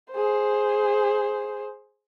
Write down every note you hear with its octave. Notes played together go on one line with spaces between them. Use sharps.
G#4 C5